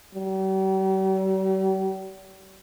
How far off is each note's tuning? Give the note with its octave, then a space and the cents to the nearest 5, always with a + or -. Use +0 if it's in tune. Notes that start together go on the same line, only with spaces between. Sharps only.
G3 -45